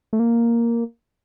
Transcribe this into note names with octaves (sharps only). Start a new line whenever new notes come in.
A3
A#3